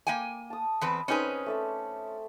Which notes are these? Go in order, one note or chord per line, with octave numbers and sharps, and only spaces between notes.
A#3 G5 G#5
A5 D#6
E2 C4 B4
C4 C#4 D#4 G#4 B4 C5
A3 D5 E5